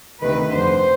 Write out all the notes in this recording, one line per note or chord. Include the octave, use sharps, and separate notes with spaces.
D2 C3 D#3 B4
F2 D3 C5